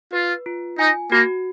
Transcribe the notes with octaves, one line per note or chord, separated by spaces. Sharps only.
F4 B4
F4
D#4 G#5
A#3 F#4